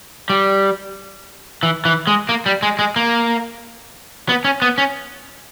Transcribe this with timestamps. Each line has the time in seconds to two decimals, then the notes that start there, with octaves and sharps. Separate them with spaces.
0.30 G3
1.63 E3
1.85 E3
2.07 G#3
2.29 A#3
2.46 G3
2.63 G#3
2.79 G#3
2.96 A#3
4.29 B3
4.45 C#4
4.62 B3
4.78 C#4